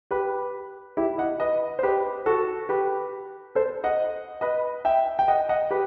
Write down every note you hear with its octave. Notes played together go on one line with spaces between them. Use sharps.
G4 B4
E4 G4
D#5 F#5
B4 D#5
C5
G4 B4
F#4 A4
G4 B4
A4 C5
D#5 F#5
B4 D#5
E5 G5
G5
D#5 F#5
D#5 F#5
G4 B4